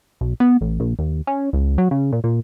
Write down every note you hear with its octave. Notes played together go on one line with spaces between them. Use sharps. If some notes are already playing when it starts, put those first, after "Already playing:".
B1
B3
A1
A#1
D#2
C#4
C#2
F#3
C#3
A#2
A#2